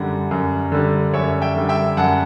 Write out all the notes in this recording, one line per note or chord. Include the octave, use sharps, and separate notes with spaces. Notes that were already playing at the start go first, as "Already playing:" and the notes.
Already playing: F#2 D3 G3 F#5
F#2
D3 G3
F#2 C#5 E5
E5 G5
D3 G3
E5 G5
F#2 F#5 A5